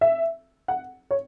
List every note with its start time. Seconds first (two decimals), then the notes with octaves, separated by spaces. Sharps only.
0.01 E5
0.68 F#5
1.11 C#5